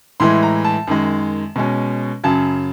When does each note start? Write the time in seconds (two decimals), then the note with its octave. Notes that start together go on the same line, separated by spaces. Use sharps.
0.20 A2 E3 G#3 C6
0.43 A#5
0.65 A5
0.87 F#2 D#3 G#3
1.56 B2 G#3 C#4
2.24 F#2 C#3 F#3 A5